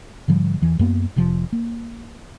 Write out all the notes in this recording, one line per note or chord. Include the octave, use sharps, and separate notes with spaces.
G#2 D3 F3 G3
E2 E3
F#2 A#3 B3
F1 C3 F3
A#3